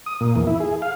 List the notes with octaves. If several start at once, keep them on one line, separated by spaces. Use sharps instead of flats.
D#6
A#2
E2
E4
G#4
F5